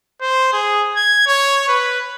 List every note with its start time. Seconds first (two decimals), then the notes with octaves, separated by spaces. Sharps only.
0.21 C5
0.53 G#4
0.96 G#6
1.27 C#5
1.69 B4